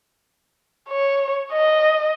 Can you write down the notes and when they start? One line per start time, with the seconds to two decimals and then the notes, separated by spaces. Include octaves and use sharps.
0.90 C#5
1.53 D#5